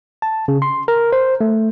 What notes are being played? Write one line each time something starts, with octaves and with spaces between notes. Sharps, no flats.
A5
C#3
C6
A#4
C5
A3